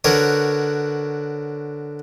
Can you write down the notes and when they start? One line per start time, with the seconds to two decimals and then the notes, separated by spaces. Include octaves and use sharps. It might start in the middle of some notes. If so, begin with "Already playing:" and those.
0.04 D3 F#4 A#4 B4 C#5